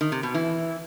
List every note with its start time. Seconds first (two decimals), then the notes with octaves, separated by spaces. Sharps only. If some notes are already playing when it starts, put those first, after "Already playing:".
0.01 D#3
0.12 C3
0.23 B2
0.34 E3